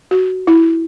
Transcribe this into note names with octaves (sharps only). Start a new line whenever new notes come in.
F#4
E4